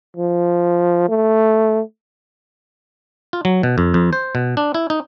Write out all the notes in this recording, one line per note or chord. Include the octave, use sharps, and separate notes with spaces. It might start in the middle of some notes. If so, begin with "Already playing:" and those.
F3
A3
F4
F#3
B2
F2
F2
C5
B2
D4
E4
D#4